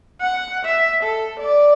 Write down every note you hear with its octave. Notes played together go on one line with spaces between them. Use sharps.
F#5
E5
A4
D5